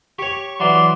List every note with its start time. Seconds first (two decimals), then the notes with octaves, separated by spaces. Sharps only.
0.19 G4 C#5 C#6
0.60 E3 F#3 D5 C6